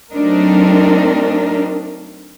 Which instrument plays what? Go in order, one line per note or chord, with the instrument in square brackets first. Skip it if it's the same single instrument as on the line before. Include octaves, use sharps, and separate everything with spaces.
[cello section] F#3 A3 C4 D4 D#4 A#4